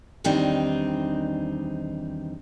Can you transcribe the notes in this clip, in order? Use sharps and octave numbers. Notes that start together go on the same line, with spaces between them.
E2 D#3 G3 C4 D4 D#4